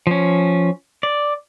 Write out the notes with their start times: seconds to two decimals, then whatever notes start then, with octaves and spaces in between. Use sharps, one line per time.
0.07 F3 C#4
1.03 D5